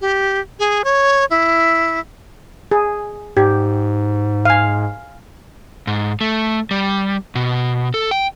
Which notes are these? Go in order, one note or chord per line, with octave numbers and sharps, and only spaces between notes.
G4
G#4
C#5
E4
G#4
G#2 G4
F5 G#5
G#2
A3
G3
B2
A4
G5